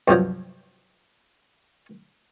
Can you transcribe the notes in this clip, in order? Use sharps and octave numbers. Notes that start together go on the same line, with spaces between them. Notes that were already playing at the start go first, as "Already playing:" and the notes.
G2 C3 F3 F#3